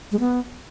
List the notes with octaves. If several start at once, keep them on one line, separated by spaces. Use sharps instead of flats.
G#3
B3